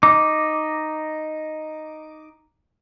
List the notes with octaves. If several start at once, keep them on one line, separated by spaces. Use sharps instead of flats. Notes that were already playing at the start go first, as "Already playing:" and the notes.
D#4 D6